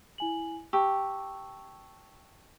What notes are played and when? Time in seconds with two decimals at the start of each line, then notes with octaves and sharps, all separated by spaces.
0.18 E4 G#5 F#7
0.73 G4 A5 C#6 E6